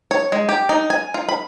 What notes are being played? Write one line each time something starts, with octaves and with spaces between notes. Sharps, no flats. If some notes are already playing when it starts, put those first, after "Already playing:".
C#5
G#3
G4
D#4
G#5
F4
B5